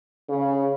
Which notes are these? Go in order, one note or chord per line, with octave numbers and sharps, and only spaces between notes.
C#3